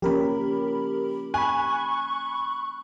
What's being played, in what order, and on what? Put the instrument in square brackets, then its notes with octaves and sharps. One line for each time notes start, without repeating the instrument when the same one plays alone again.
[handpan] F3 A#3 C#4 [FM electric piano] G4 A#4 B5
[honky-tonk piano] G#5 [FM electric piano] B5 F#6 [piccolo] C#6